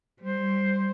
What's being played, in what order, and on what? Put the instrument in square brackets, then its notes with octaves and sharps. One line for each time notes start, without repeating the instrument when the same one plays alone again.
[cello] G3 [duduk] C5